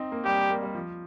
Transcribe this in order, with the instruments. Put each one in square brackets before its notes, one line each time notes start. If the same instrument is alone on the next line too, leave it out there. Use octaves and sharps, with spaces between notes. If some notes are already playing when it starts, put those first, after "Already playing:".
Already playing: [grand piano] C4 D#4
A#3
[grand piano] G3 [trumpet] G4
[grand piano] G3
A#3
G3
F3